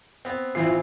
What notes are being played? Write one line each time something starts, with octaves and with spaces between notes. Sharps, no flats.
B3 C4
A1 E3 C4 E4 F4 C7